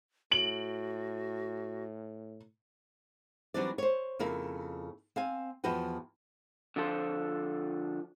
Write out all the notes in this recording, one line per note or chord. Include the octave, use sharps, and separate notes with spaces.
A2 F#4 D7 F#7
E3 F#3 G3 C4 D4 D5
C5 C#5
F2 C#3 A#3 E4
C4 F5 G#5
E2 F3 F#4 B4 G5
D3 F3 F4 A4 B4 C5